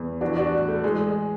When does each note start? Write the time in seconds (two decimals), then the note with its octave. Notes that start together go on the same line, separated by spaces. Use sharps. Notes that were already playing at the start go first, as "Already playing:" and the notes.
Already playing: E2
0.21 E3 D4 F#4
0.37 D4 F#4
0.52 A2
0.68 A3
0.83 E3 G#3
0.99 G#3